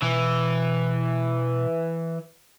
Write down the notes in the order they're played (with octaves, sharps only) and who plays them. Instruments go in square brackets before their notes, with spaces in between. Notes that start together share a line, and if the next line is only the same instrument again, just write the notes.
[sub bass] B2 [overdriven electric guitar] E3